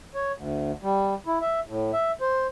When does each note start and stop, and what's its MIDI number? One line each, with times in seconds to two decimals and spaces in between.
0.15 0.32 73
0.36 0.72 38
0.83 1.14 55
1.26 1.38 64
1.41 1.60 76
1.67 1.91 45
1.93 2.12 76
2.21 2.47 72